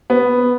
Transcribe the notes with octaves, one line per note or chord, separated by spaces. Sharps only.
B3